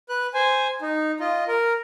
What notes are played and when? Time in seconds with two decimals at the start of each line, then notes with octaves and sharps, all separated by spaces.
0.09 B4 F#6
0.34 C5 G#5
0.82 D#4
1.20 F4 D#5
1.48 A#4